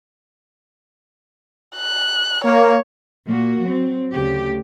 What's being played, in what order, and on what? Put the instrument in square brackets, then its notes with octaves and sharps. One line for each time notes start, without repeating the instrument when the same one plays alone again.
[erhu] F#6
[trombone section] A#3 [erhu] C#5
[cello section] A#2 A#3 F#4
F#3 C4
D2 C#3 A3 G4